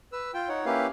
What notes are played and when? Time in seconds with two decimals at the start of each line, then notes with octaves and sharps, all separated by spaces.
0.12 B4 E6
0.34 F4 G5
0.49 D#4 C#5 F#5
0.66 A#3 C#4 E4 G4 B4 F5